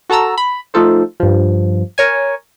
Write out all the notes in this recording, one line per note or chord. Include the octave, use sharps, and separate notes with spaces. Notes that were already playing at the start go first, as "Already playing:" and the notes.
F#4 A4 A5 A#5 E6
B5
F3 A3 D#4 F4 A4 C5
G2 F3
A#4 C#5 G#5